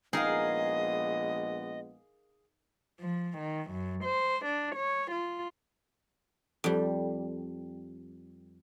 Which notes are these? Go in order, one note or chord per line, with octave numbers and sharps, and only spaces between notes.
A#1 G#3 B3 D#4 G#4 A#4 D#5 F5
F3
D#3
F#2
C5
D4
C#5
F4
F2 G3